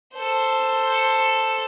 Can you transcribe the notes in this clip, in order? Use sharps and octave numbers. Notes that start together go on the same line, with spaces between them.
A4 C5